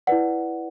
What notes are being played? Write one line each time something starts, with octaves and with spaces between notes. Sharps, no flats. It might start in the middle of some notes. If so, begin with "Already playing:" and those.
E4 B4 D5 F#5